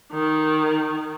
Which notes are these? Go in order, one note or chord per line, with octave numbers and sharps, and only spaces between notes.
D#3